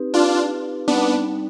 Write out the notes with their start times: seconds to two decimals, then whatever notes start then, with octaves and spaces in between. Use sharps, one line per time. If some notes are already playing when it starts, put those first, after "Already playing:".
Already playing: C4 D#4 G4 B4
0.14 D4 F4
0.88 G3 B3 C4 D4 D#4